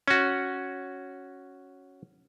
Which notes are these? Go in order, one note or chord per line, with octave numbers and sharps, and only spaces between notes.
C#4 F#4